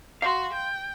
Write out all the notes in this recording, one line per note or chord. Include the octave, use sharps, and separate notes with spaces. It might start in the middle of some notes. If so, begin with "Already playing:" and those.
F#4 F5 C6
G5